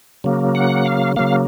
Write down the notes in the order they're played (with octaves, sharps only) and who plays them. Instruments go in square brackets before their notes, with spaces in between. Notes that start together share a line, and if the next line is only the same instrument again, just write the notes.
[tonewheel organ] C#3 F#3 A#3
F#5
F5
C#3 F#3 A#3 F5